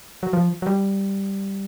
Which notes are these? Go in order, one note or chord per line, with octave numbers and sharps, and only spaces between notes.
F#3
F3
F#3
G3